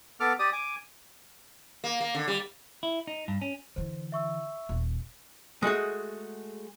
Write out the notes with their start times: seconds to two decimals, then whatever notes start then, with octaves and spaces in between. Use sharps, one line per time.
0.20 B3 A4 D6 F6
0.39 G4 D5 D#6
0.53 G#5 D6
1.84 A#3
2.00 A#3
2.15 D3
2.28 G3
2.83 E4
3.07 D#4
3.28 G2
3.42 C#4
3.76 D3 E3 C5
4.12 E5 C#6 E6
4.69 D#1
5.62 G#3 A3 F#4 G#4